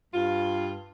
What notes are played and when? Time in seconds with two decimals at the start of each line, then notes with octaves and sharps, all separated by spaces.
0.14 G2 F4